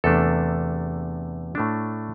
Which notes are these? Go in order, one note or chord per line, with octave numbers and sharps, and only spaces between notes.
E2 C3 A3 D4 A4
A2 A3 D4